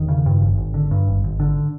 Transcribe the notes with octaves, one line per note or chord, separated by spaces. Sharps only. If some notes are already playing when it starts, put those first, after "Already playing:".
Already playing: E1 D#3
C#3
G2
G#1
G#1
D3
G2
G#1
G#1
D3